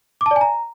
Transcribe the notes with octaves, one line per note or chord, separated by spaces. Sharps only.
D6
A5
D5
G#5
A#5